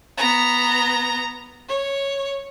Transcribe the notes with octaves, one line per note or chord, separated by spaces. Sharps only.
B3 A#5
C#5